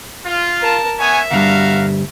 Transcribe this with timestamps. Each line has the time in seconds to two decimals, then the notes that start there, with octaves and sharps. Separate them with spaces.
0.26 F4
0.61 A#4 A5
1.00 B3 C#5 E5 G#5
1.31 D2 G2 G3 F#4 A#4 F5